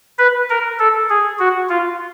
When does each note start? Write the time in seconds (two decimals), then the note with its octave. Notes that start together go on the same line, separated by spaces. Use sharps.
0.19 B4
0.49 A#4
0.79 A4
1.09 G#4
1.39 F#4
1.69 F4